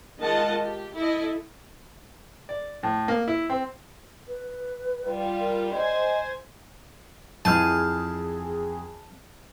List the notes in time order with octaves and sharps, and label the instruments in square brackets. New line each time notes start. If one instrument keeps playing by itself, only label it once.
[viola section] D#3 G#3 F4 D#5 F#5 A5
G4
E4 A4 D#5
[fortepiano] D5
A2
A#3
E4
C4
[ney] B4
[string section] G3 F4
[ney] A#4
[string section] C5 G#5 [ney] D#5
[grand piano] F2 E3 [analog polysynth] G#4 [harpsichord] A5 [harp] F6 G6 D#7